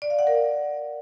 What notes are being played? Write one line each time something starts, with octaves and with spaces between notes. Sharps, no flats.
D5
F5
F#5
A#4